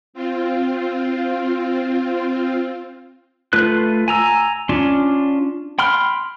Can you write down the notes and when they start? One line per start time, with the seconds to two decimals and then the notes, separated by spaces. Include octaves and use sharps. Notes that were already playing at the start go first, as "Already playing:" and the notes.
0.13 C4 F4
3.53 A3 F4 B4 F#6
4.08 G#5 A#5 E6
4.69 C#4 D4 F4
5.79 G5 B5 C6 F6